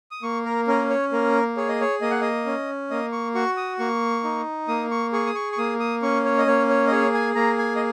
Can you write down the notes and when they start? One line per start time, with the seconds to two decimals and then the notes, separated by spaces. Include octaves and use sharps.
0.11 D#6
0.23 A#3 C#6
0.45 A#4
0.67 C#4 A#4
0.90 C#5
1.12 A#3 A#4
1.57 G#4 C#5
1.69 D#5
1.81 C#5
2.01 A#3 D#5
2.11 F#5
2.21 D#5
2.46 C#4
2.90 A#3 D#5
3.12 C#6
3.35 F#4 C#6
3.57 D#6
3.79 A#3 C#6
4.24 D#4
4.68 A#3 D#6
4.91 C#6
5.13 G#4 C#6
5.27 D#6
5.35 C#6
5.52 C#6
5.58 A#3 D#6
5.80 D#6
6.02 C#4 C#6
6.25 C#5
6.38 D#5
6.47 A#3 C#5
6.69 C#5
6.87 D#5
6.92 G#4 C#5
7.14 G#5
7.35 A#3 A#5
7.58 G#5
7.76 D#5